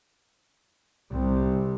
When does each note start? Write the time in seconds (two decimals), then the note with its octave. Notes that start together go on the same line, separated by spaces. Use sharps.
1.12 C2 C3